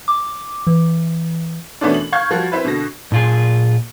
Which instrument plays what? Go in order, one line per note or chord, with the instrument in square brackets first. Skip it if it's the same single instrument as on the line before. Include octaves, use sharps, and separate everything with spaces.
[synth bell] D6
E3
[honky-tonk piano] B2 E3 A3 B3 C#4 D4
F#7
F5 C#6 G6 G#6
F3 G3 F#4
C4 E4 B4
B2 D3 A#6
[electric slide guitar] A#2 F4 G#4